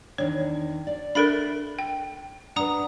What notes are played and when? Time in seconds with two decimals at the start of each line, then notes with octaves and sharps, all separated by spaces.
0.18 E2 D#3 D4 C#5
0.87 D5
1.15 D4 A4 A#4 D5 E5 B5 A6 D7
1.79 G5
2.56 D4 B4 F#5 A#5 D#6